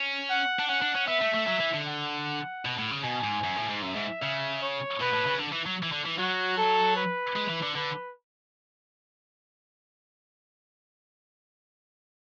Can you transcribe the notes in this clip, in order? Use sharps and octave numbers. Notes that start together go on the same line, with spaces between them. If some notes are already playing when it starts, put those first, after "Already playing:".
Already playing: C#4
F#5
D4
C#4 F#5
D4
C#4
B3 E5
A3
A3
F#3
E3
D3
F#5
B2
A2
C#3
B2 G#5
G#2
F#2
A2
G#2
F#2 E5
G#2
C#3 E5
C#5
B2 B4
A2
C#3
D3
E3
F#3
E3
D3
E3
F#3 F#4
A4
B4
G#3
E3
D3
D3 B4